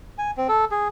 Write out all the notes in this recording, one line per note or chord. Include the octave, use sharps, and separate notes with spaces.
G#5
C4
A4
G#4